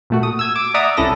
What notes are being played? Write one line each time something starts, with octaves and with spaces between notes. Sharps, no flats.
A#2 A3 F#4
D#6
E6 G#6
D6
D5 E5 F#5 A#5 D6 D#6
C2 C#4 E4 A4 A#6